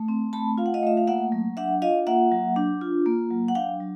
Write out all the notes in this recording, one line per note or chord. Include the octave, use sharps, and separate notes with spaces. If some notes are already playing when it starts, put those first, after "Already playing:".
Already playing: A3
C4
A3 A5 B5
F4 F5
F#5
D#5 F5
A3 E5
F5
A#3 E5 F#5
F#3
D4 E5 F#5
F4 D#5 F5
A#3 E5 F#5
F#3
D4
F4
A#3
F#3
F#5
D4 F5 G5
F#3